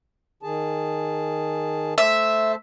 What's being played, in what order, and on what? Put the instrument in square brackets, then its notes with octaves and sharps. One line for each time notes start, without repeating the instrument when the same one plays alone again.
[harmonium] D#3 G#4 A5
[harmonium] A3 C5 A5 [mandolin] E5